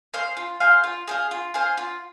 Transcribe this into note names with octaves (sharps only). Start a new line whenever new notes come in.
G#4 C5 F5
F4
G#4 C5 F5
F4
G#4 C5 F5
F4
G#4 C5 F5
F4